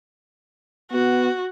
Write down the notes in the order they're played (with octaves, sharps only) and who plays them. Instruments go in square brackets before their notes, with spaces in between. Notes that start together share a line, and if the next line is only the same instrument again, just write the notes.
[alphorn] B3 [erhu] F#4